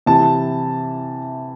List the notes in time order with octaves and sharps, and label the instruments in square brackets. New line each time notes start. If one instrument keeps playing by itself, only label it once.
[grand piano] C3 E3 A5